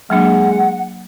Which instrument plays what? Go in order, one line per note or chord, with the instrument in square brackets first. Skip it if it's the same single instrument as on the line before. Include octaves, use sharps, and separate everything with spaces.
[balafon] F#3 A#3 D4 [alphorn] G#3 [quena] F#5